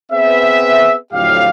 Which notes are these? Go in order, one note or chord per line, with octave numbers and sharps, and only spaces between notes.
B3 C4 G#4 B4 E5
F2 A2 D3 F#3 G4 F5